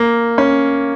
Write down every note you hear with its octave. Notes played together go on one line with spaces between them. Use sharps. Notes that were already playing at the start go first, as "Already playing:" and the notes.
Already playing: A#3
C#4